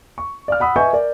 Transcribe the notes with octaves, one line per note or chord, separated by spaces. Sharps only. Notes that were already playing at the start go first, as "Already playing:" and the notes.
C#6
D5 F5 F6
F#5 B5 D#6 E6
B4 D#5 E5 G#5 C#6 G6
A#4 D5